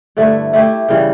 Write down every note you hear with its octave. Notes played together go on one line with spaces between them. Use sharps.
G2 D3 A3 E4
A3 E4 G4
C#3 E3 G3